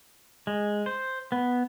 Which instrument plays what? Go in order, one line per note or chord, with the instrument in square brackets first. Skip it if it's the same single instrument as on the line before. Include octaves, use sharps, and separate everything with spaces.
[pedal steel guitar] G#3
C5
B3